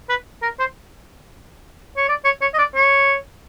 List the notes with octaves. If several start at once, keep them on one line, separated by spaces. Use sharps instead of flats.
B4
A#4
C5
C#5
D5
C#5
C#5
D#5
D5
C#5